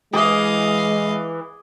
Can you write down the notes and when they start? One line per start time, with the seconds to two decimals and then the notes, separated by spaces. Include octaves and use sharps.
0.13 E3 G#3 G#4 D#5 F5 D6